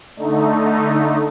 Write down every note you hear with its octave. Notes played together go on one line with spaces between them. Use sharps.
D3 A3 D#4